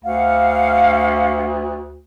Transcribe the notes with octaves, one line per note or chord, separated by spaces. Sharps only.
D2 F5 F#5